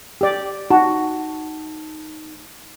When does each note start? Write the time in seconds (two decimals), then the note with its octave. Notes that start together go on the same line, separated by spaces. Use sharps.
0.21 G4 D5
0.71 D#4 F#4 A5